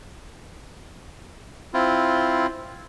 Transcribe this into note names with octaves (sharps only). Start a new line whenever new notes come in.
C4 E4 F4